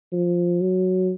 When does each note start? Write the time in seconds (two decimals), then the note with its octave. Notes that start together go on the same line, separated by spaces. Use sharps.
0.12 F3
0.61 F#3